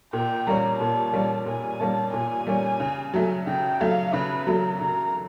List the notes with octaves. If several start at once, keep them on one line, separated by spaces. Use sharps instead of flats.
A#2 G5
G3 A#3 C#4 A#5
A#2 A5
G3 A#3 C#4
A#2 G#5
G3 A#3 C#4 A5
A#2 G#5
G3 A#3 C#4
C#3
F#3 A3
C#3 G5
F#3 A3 F5
C#3 B4
F#3 A3 A#4
C#3 A#4